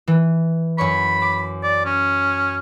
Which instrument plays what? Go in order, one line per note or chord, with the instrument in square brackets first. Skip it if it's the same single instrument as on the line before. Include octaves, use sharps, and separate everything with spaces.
[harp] E3
[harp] F#2 C#5 C#6 [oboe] B5
[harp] D6
[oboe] D5
C#4